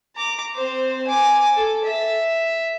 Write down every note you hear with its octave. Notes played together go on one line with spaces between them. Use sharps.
A#5 D6
C4 C5
G#5 D6
A4
E5